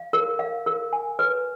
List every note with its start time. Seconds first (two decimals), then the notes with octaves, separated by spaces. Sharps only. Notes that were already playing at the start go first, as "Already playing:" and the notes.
Already playing: F5
0.13 A#4
0.39 F5
0.66 A#4
0.93 G#5
1.19 B4